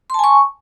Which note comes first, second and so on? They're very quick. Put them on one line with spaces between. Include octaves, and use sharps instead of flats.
C6 A5 G#5 C#6